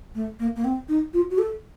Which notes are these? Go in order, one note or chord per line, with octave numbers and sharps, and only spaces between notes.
A3
A#3
A#3
C4
D#4
F4
F#4
A4